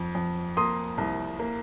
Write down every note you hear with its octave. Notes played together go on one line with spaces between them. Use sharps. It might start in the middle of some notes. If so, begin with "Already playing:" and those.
Already playing: F2
F2
A#3 C6 D#6
C2
A#3